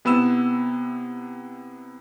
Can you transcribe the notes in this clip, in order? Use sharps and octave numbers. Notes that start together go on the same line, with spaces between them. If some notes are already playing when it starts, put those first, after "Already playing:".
C3 B3 E4 E6 E7